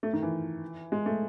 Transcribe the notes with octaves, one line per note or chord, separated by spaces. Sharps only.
A3
D#3
E3
G#3
A3